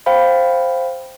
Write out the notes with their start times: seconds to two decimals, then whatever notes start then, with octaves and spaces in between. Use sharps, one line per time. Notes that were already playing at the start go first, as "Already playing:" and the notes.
0.06 C5 F5 G5 B5